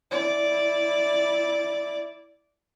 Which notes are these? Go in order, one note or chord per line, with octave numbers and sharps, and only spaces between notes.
E4 D5